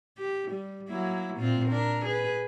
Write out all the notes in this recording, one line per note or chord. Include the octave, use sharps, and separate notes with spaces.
G4
G3
F#3 A#3 E4
A#2 C4 F4
D4 A#4
G#4 B4